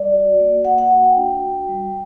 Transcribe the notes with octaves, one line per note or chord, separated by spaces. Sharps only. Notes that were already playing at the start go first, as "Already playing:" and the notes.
Already playing: G3 D5
F#4
A#3
A#3 F#5
F#5
F#4 F#5
G5
D4
F#4
G3